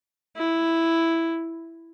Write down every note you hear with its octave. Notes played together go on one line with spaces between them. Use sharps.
E4